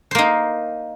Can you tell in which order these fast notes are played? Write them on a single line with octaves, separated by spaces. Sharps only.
C5 A#3 D#4